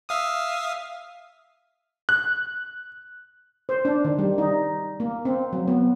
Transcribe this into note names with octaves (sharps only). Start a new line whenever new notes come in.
E5 F5 D#6
F#6
C5
D4
D#3
G3
D#4
A#3
C4
F#3
B3